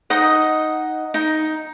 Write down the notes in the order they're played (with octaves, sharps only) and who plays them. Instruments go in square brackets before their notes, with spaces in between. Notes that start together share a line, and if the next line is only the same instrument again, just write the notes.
[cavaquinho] D#4 D#5 F#5
D#4